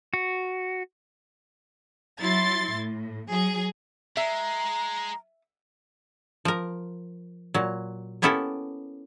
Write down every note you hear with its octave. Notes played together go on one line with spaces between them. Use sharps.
F#4
F#3 E4 C6 A6
A2
F#3 G#4
G#3 E5 A#5
F3 A#4
A#2 F#3
A#3 B3 C#4 E4 G4 A4